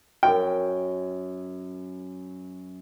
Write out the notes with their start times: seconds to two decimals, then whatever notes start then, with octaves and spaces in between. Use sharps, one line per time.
0.23 F#2 G5